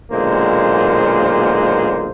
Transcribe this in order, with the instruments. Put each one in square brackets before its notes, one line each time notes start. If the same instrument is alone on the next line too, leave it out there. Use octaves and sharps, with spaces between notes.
[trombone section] B1 A#2 D3 G#3 A#3 C5